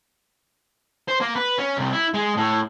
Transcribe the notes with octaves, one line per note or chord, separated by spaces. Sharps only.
C5
A#3
B4
C#4
C2
E4
G#3
A2